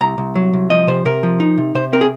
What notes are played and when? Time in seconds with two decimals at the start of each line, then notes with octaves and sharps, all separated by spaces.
0.01 C2 A#5
0.18 C2
0.35 F#3
0.53 C2
0.70 F3 D#5
0.87 C3 C5
1.05 C3 A#4
1.23 F3
1.40 D#4
1.58 C3
1.75 C3 C5
1.93 C4 A#4
2.01 G#4